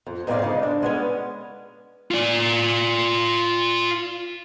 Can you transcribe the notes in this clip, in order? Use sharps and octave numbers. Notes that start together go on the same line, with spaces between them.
F2
G#2 G#3 C4 C5 D5 F5
C#3 G#3 D#4
D4
G#3 B3 C#4
F4 D5